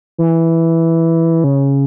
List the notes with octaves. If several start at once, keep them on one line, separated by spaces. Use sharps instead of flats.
E3
C#3